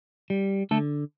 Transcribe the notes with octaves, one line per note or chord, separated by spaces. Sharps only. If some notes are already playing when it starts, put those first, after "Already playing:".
G3
D3 A3 A4